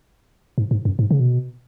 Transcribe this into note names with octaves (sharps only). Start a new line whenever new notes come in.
G#2
G#2
F#2
G#2
C#3
B2